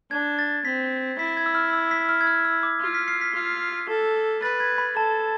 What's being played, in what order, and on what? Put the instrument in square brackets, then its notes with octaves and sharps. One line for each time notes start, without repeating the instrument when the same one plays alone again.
[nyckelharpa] D4 [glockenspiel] G#6
[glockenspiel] A6
[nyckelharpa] C4 [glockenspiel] B6
[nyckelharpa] E4 [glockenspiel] B6
[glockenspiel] G#6
E6
F6
E6
B6
F6
G#6
F6
E6
D6
[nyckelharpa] F4
[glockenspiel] B6
C7
B6
[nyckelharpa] F4
A4
[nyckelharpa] B4 [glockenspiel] A6
[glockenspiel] G#6
B5
[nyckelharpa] A4 [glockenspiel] A5